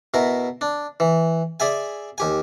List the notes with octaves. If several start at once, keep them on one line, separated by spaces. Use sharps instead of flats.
B2 E4 A#4
D4
E3
G#4 D5 E5 G#5
D#2 G4 G#5